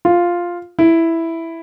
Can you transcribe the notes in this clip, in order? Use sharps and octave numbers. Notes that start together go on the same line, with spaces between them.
F4
E4